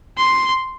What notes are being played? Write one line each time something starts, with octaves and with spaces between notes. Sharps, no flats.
C6